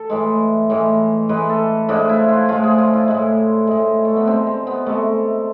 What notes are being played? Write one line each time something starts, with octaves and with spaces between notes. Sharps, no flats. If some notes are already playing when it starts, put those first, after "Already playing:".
Already playing: A4
A2 E3 G#3
A2 E3 G#3
A2 E3 G#3 B4
A4
A2 F3 G#3 D4
E4
F4
A2 F3 G#3 F4
G#4
F4
E4
A2 G#3
A2 G#3
A3
B3
C3 G#3 C4
C4
B3
C3 G#3 A3